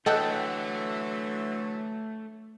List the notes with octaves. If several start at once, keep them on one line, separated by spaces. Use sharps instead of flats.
D3 E3 F#3 A3 A4 D#5 F#5 G5